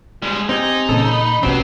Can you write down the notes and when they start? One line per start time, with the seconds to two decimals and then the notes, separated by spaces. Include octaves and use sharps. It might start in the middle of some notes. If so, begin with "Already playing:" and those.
0.22 G3 G#3
0.49 C4 D#4 G4 G#5
0.89 A#2 C#3 E3 A4
1.07 B5
1.43 B1 C3 C4 C#4 F#4 G4 B4